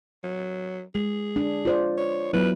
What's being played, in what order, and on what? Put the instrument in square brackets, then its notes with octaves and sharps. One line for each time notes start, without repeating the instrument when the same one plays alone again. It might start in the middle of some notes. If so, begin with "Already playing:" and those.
[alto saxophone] F#3
[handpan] G#3 [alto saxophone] G#4
[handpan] D4
F4 C5 D5
[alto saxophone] C#5
[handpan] F#3 B3 E4 [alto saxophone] B4